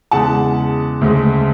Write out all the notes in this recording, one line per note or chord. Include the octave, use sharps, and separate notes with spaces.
E2 C#3 G#3 F#5 A5
D2 C#3 G#3